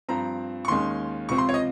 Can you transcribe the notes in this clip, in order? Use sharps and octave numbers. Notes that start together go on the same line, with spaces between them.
G2 F3 C4 A#5
C#6
D#2 D#3 G#3 C#4 C6
C#2 C3 F3 C4 C#6
C6
C#5
D#5